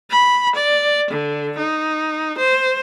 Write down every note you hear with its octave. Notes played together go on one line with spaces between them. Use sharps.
B5
D5
D3
D#4
C5